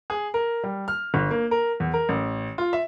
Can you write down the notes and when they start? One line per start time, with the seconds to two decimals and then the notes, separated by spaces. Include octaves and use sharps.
0.10 G#4
0.34 A#4
0.63 G3
0.88 F6
1.14 G1
1.31 A#3
1.51 A#4
1.80 E2
1.94 A#4
2.09 A1
2.58 F4
2.73 E5